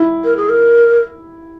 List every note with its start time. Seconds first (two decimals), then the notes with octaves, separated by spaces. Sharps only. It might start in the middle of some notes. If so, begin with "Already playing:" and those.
Already playing: E4
0.24 A#4
0.37 G#4
0.49 A#4